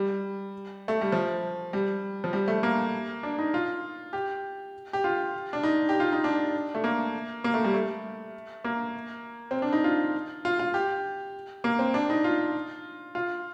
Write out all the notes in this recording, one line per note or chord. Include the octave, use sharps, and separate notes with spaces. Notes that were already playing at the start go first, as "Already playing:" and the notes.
Already playing: G3
A3
G3
F3
G3
F3
G3
A3
A#3
D4
D#4
F4
G4
G4
F4
D4
D#4
G4
F4
D#4
D4
A3
A#3
A#3
A3
G3
A3
A#3
C4
D4
D#4
F4
F4
F4
G4
A#3
C4
D4
D#4
F4
F4